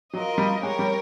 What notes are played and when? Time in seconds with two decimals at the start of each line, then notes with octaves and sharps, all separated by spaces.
0.13 F#3 F4 A#4 D#5
0.38 G3
0.62 G#3 G4 A#4 C#5
0.79 G3